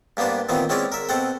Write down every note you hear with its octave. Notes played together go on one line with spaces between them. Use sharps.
G2 A#3 B3 D4 C5
A#2 D#3 E3 B3 C4
G#3 C4 C#4 E4 C#5 D5
A#4 E5
B2 C4 A4 F#5 G5